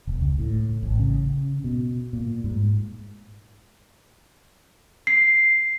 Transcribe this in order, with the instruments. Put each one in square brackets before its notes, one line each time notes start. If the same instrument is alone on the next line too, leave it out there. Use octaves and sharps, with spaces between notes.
[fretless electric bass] E1
C#2
A2
A1
C#3
B2
A#2
G#2
[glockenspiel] C7